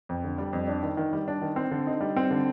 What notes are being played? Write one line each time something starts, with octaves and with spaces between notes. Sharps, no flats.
F2
D3
G3
F2
D4
D#3
D#3
G3
D4
D#3
C4
D3
D#4
G3
C4
D3